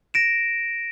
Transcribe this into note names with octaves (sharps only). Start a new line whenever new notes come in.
A#6 D7 E7